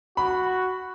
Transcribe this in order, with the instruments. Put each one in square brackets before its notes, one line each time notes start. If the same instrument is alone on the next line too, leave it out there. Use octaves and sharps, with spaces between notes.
[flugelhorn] F#4 [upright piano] B5